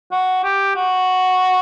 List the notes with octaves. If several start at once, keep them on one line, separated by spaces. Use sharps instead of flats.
F#4
G4
F#4